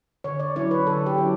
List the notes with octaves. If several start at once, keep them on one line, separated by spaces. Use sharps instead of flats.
D3 C#5
D5
F#3 C#4 E4 C#5
B4
D3 A4
G4
F#3 C#4 E4